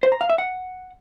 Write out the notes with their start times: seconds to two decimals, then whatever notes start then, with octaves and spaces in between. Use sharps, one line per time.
0.03 C5
0.12 A#5
0.21 F5
0.30 E5
0.38 F#5